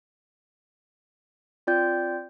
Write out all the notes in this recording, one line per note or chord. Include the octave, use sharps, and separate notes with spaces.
C4 F4 D5 G5 G6